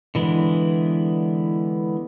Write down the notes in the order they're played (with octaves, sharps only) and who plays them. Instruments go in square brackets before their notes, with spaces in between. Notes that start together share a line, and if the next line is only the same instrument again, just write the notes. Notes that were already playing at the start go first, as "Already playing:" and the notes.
[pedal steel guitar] D3 E3 G#3 B3